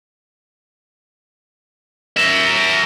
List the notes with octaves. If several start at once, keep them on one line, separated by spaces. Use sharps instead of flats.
A#4 E5